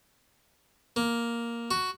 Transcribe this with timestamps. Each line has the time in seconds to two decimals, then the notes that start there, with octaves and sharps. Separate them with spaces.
0.96 A#3
1.71 F#4